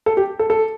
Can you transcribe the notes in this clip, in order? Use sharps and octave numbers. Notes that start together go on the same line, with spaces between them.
A4
G4
A4
A4